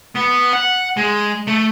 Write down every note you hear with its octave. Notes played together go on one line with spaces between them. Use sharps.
B3
F#5
G#3
A3